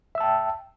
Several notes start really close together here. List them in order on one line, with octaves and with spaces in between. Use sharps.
E5 E6 A5 G5